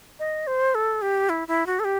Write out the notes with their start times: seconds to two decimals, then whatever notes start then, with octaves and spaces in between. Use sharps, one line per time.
0.19 D#5
0.47 C5
0.75 A4
1.02 G4
1.29 E4
1.48 E4
1.66 F#4
1.80 A4
1.85 G4